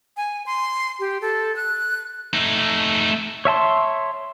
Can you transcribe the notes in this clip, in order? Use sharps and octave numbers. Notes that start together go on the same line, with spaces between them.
G#5
C6
G4
A4
F#6
A3 D#4
C#5 E5 A5 C6